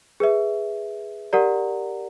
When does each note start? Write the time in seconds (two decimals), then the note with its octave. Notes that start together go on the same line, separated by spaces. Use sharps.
0.20 G#4 B4 E5
1.33 G4 A#4 D5 F#5 A#5